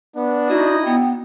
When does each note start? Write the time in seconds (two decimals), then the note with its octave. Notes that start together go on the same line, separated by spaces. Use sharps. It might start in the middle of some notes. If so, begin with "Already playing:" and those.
0.16 B3 D4
0.49 D#4 E4 F#4 D#5 D#6
0.85 B3 G5